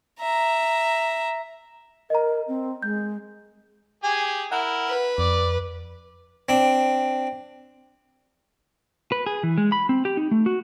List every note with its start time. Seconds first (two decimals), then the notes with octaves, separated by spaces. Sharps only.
0.21 E5 A#5
2.10 A#4 D#5 A#5
2.48 C4
2.83 G#3 G6
4.04 G4 G#4 G#5
4.52 E4 A#4 F#5
4.88 B4
5.18 F2 D5
6.49 C4 D4
9.12 B4
9.27 G#4
9.43 E3
9.58 G#3
9.72 B5
9.89 C4
10.05 G4
10.17 D#4
10.31 A3
10.46 F#4